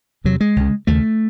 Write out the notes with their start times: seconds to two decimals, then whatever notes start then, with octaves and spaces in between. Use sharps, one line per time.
0.24 E2 C3 F#3
0.41 G#3
0.56 C#2 C#3
0.87 D#2 C#3 A3